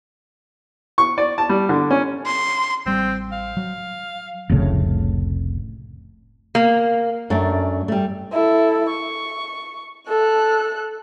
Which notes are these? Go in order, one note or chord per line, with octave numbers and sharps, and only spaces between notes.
C#6
D5
A5
G3
D3
C#4
C6
A1 G3 C4
F5
F#3
F1 C2 A2 C#3
A#3
F#2 A3 D4
G3 A3
E4 A4
C#6
A4 F#6